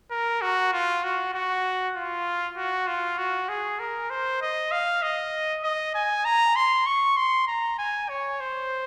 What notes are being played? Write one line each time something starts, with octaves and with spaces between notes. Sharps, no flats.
A#4
F#4
F4
F#4
F#4
F4
F#4
F4
F#4
G#4
A#4
C5
D#5
F5
D#5
D#5
G#5
A#5
C6
C#6
C6
A#5
G#5
C#5
C5